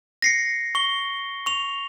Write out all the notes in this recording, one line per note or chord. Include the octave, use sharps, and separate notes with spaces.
A#6 C7 C#7
C#6 G7
C#6 F7